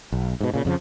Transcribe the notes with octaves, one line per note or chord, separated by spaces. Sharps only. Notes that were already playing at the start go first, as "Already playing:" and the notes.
B1
G#2 B2
A#2 C#3
F2 C#3 F3